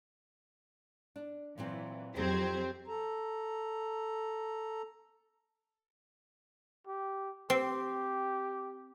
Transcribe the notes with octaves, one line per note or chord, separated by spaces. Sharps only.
D4
A#2 E3 F#3 C4
F2 F#3 C4 D#4 G4 G#4 A#4 G#6
A4 A#5
G4
C4 G4